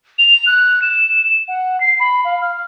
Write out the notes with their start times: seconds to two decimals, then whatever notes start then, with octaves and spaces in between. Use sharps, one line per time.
0.19 F7
0.46 F#6
0.82 E7
1.48 F#5
1.80 C7
1.99 B5
2.25 F5
2.41 F6